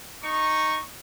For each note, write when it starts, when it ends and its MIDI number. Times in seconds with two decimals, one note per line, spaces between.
0.24 0.80 63
0.24 0.80 85